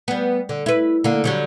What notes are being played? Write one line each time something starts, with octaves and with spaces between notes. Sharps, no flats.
G3 B3
D3
E4 B4
D3 A#3
D3 F#3 G3